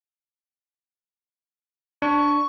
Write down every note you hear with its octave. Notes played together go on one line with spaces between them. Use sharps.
D4 C#6